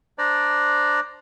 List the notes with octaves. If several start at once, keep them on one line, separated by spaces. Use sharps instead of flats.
D4 C5 D5 A#5